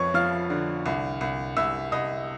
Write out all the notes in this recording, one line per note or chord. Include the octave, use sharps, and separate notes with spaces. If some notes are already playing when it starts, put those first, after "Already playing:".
Already playing: F2 F3 B4 C#5 C#6
F3 F5 F6
D3
C2
C2
C2 E5 E6
C2 D#5 D#6